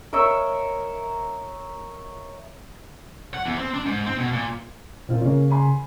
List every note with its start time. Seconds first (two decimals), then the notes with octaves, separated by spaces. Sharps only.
0.13 A#4 C#5 D#5 E5
3.34 F#5
3.46 E2
3.57 C4
3.74 D4
3.86 G#2
4.06 C4
4.18 B2
4.32 A#2
5.09 A#2 C4 F4 A#4
5.22 C#3 A#3 C#4
5.51 G#5 B5 C6